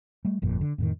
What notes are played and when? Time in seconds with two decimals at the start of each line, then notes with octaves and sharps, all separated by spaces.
0.25 G3 A3
0.42 G1 F2 A#2
0.61 D3
0.78 F2 A2 D#3